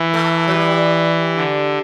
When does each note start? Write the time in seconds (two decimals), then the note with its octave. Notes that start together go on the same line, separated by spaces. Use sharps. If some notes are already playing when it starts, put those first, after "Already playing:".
Already playing: E3
0.14 A3
0.48 F#3
0.54 G3
1.36 D3